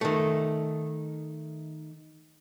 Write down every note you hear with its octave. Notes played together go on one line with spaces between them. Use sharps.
D#3 A3